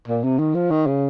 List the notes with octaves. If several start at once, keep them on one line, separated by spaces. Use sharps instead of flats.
A#2
C3
D#3
F3
D#3
C#3